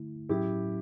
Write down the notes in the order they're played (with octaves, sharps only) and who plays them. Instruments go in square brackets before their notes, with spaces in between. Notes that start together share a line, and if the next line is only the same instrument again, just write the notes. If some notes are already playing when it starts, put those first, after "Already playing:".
Already playing: [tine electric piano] D3 A3 E4
[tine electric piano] A2 F#3 C#4 [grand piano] E4 G4